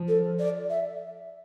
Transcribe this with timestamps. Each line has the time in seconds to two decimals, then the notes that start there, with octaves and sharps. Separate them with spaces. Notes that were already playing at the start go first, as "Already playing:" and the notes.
Already playing: F3
0.08 A4
0.39 D5
0.70 E5